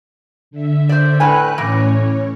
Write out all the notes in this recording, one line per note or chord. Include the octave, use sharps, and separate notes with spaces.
D3 E5
C5 D5
A2 B4 G#5 F#6
A2 E3 C#4 C#5